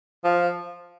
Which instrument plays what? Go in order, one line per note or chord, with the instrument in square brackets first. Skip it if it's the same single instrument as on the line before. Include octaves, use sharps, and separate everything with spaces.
[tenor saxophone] F3